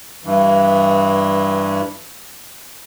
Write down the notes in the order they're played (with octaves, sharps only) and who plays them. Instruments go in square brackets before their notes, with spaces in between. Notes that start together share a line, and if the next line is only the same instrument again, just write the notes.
[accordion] G2 E3